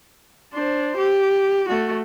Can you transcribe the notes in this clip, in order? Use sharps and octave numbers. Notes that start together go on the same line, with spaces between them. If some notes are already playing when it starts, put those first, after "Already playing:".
D4 C5
G4
A3 F#4